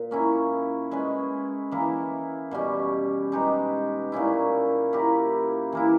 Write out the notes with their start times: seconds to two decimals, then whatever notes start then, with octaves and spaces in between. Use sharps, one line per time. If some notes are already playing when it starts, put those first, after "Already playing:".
Already playing: A#2
0.11 A#3 C#4 E4
0.91 G#3 C#4 G#4 B4
1.71 E3 A#3 E4
2.51 B2 G3 C#4 G4
3.32 G#3 D#4 G4 B4
4.12 A#2 A#3 C#4 E4
4.93 A#3 E4 G4 A#4
5.72 E3 A#3 E4